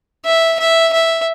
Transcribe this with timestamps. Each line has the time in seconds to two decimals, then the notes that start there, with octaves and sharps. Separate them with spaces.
0.26 E5
0.60 E5
0.94 E5